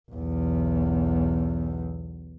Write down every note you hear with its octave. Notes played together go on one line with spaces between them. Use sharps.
B1 E2